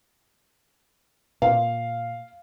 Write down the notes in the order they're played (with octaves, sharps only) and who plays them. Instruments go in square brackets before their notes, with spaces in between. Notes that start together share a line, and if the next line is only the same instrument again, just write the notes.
[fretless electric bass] A#2 [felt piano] F5